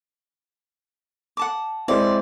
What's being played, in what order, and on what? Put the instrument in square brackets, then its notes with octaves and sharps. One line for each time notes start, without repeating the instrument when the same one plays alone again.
[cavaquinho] F#5 A5 D6
[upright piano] G#3 C4 E4 [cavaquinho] D5